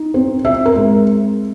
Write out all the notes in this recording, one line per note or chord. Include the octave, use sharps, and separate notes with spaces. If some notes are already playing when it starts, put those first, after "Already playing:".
Already playing: D#4
C4
C4 E5
A#4
G#3